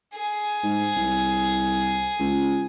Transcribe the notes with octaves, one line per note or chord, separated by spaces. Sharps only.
G#4
G#2
C2
C#2